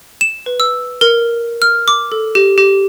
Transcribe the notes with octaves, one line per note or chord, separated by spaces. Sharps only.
E7
B4
E6
A#4
F6
D6
A4
G4
G4